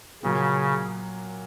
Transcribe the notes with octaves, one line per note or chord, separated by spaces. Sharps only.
A#2 C#3 F#3 A#3